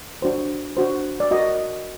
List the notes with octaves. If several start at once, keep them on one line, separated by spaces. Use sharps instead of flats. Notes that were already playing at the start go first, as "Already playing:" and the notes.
D4 F#4 C5
D4 F#4 C5
D5
F#4 A#4 D#5